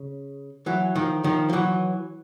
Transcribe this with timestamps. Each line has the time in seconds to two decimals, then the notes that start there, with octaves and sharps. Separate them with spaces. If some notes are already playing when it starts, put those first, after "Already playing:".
Already playing: C#3
0.66 E3 F#3
0.96 D#3 F3
1.24 D#3 F3
1.50 F3
1.53 E3 F#3